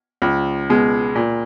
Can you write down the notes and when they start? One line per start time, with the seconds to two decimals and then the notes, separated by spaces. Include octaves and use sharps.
0.22 C#2
0.70 B2 G#3
1.16 A#2